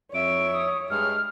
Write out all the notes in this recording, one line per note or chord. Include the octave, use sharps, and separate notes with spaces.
F2 C#5 E5 D7
D#6
G2 G#3 F6